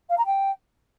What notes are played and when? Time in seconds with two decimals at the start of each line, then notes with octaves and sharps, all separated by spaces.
0.09 F5
0.17 A#5
0.25 G5